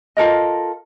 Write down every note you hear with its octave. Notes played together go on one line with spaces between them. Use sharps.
F4 A4 A#4 D#5